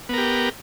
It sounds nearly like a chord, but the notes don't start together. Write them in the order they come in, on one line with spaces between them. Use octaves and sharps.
B3 A#4 G4